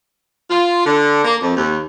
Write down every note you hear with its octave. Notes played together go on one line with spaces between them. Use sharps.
F4
D3
A#3
F2
D#2